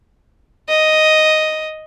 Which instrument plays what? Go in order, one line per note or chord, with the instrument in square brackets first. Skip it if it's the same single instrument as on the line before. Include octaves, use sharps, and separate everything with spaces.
[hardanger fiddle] D#5